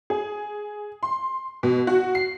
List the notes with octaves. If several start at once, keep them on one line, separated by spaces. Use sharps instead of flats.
G#4
C6
B2
F#4
C7